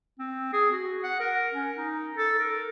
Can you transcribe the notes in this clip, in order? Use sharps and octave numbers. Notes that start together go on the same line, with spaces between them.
C4
G#4
F#4
F#5
A#4
C#4
D#4
A4
A#4